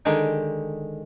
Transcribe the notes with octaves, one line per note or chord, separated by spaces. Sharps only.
D3 D#3 G#3 G4